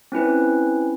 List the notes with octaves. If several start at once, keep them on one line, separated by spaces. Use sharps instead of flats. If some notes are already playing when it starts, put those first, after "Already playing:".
C4 C#4 E4 B4